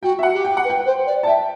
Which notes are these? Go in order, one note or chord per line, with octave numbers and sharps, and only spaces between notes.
F#4 G5
E5
F#5
G4
G5
F#5
B4
G5
C5
D5
A5
E5 G5